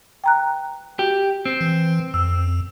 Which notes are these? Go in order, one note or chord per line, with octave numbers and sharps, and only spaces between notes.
G5 A#5 F#6
F#4 G4
C4
E3
F2 E6